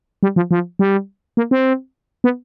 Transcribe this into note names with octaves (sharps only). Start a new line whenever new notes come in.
G3
F3
F3
G3
A#3
C4
B3